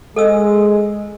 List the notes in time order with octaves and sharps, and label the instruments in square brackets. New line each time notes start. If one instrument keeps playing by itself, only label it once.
[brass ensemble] G#3 [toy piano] A4 D#5 E6